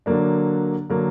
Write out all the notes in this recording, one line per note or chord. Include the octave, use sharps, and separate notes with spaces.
D3 F#3 A#3 D4
D3 F#3 A#3 D4